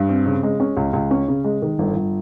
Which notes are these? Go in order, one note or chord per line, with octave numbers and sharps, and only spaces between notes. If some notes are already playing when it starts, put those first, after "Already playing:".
Already playing: G2
C4
C#3
G#3
C#4
C#2
C#2
C#4
C#3
G#3
D#3
G1
G1